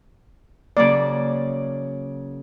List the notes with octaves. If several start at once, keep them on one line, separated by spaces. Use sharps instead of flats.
C#3 F#3 A#3 D5